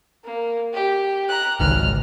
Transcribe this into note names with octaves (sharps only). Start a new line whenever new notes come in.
A#3
G4
A#5 F#6
G#1 C#2 F6